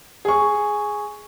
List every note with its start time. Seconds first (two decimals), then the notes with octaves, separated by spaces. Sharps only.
0.25 G#4 C#6